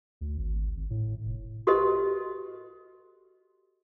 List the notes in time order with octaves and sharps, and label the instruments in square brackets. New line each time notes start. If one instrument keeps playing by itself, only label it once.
[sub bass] D2
G#1
G#1
A2
F1
[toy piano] F#4 G4 A4 B4 C5 D#5